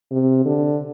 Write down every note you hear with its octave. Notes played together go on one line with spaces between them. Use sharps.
C3
D3